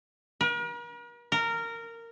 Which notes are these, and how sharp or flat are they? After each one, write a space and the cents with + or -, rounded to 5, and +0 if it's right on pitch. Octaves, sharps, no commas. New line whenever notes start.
A#4 +45
A#4 -15